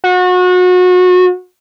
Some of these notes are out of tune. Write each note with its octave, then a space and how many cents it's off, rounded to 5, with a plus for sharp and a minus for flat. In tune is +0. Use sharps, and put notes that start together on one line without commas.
F#4 -30